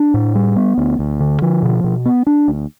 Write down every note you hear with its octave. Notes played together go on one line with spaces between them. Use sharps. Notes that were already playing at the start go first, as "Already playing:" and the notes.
Already playing: D4
A2
G3
B3
D2
D2
D3
F3
B2
B2
B3
D4
D2